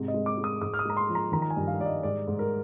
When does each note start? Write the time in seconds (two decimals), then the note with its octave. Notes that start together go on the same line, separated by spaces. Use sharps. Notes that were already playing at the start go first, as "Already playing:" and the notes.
Already playing: G#2 C3
0.08 D#5
0.14 G#3
0.26 D6
0.38 G#3
0.44 D#6
0.61 G#2 D#6
0.74 F6
0.79 D#6
0.85 G#3 A#5
0.97 C6
1.09 F3
1.15 A#5
1.32 D#3 A#5
1.42 A#5
1.50 G#5
1.56 G2
1.67 F5
1.80 G3 D5
1.86 D#5
2.03 G#2 D5
2.28 G#2
2.39 A#4